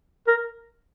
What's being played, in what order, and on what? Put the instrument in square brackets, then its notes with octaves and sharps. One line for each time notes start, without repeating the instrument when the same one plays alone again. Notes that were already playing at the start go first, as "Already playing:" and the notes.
[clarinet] A#4